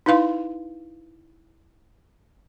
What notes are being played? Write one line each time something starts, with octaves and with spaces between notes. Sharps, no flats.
D#4 E4 B4 F5 C6